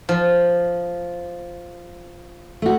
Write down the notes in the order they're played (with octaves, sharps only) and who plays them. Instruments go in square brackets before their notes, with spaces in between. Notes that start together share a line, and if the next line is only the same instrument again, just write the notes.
[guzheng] F3
[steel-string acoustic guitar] A3 F#4